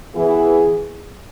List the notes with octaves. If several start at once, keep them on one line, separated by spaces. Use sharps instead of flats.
E3 B3 E4 G#4